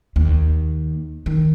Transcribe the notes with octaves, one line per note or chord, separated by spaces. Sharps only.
D#2
D#3